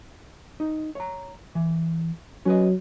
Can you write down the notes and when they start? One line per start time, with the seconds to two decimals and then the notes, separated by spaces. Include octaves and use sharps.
0.60 D#4
0.95 C#5 A#5
1.55 E3
2.45 F#3 C#4 B4 D#5